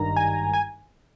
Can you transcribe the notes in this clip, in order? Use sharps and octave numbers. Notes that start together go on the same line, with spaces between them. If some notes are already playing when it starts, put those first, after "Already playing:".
Already playing: G#1 G2 D#3 A#5
G#5
G#5